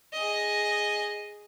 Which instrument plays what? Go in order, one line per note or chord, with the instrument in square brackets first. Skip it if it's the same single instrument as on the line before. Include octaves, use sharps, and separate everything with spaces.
[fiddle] G#4 D#5